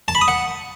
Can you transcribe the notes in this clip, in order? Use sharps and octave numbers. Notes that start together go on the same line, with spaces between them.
A5
B5
D#6
F#5